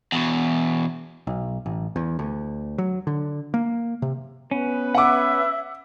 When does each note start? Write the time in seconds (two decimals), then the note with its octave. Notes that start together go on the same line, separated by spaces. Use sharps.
0.12 E2 B2
1.27 B1
1.66 A1
1.96 E2
2.19 D2
2.78 F#3
3.07 D3
3.54 A#3
4.02 C3
4.51 B3 C#4 B4
4.95 E5 F#5 D6